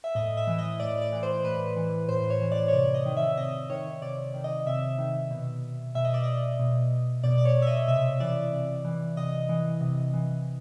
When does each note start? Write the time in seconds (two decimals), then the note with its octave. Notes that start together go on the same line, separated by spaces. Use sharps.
0.04 E5
0.15 A2 D#5
0.37 E5
0.47 E3
0.58 D#5
0.80 A2 D5
1.02 D5
1.12 E3
1.23 C5
1.44 A2 B4
1.77 E3
2.08 A2 C5
2.30 C#5
2.41 E3
2.52 D5
2.68 C#5
2.73 C3 D5
2.94 D#5
3.06 D#3
3.17 E5
3.37 C3 D#5
3.70 D#3 C#5
4.02 C3 D5
4.34 D#3
4.44 D#5
4.66 C3 E5
4.98 D#3
5.31 B2
5.95 B2 E5
6.05 D#5
6.14 D5
6.24 D#5
6.60 B2
7.23 B2 D5
7.38 D5
7.45 C#5
7.62 E5
7.67 D#5
7.88 C3 E5
8.20 E3 D5
8.52 C3
8.85 E3
9.17 C3 D#5
9.49 E3
9.81 C3
10.14 E3